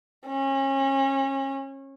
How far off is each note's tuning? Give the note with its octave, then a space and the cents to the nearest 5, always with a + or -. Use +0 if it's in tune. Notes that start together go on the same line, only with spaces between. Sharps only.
C#4 -30